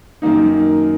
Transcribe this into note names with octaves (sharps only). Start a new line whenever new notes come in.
F#2 D#3 A#3 D#4